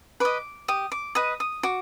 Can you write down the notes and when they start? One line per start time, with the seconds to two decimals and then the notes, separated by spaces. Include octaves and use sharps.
0.20 B4 D#5 D6
0.68 G4 D#6
0.92 D6
1.15 B4 D#5 D#6
1.40 D#6
1.63 F#4 D6